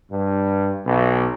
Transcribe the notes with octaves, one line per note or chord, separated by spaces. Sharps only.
G2
B1